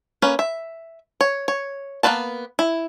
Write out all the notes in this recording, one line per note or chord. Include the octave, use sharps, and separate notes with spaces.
A#3 C#4 B4
E5
C#5
C#5
A#3 B3 D#4 B4 A5
E4